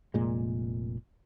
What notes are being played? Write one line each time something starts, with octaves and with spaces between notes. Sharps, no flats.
F1 A#2 G#3